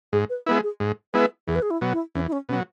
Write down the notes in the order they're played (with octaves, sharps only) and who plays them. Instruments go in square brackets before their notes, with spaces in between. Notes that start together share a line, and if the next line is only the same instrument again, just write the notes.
[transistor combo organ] G#2 [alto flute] G#4
[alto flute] B4
[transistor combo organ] G#3 B3 E4 [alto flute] B4
[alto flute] G#4
[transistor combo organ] G#2
[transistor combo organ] G#3 B3 E4 [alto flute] B4
[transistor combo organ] E2 [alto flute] G#4
[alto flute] B4
G#4
E4
[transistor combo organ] B2 F#3
[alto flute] E4
[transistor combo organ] E2 [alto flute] C#4
[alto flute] E4
C#4
[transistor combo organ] B2 [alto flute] C#4
[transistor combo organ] F#3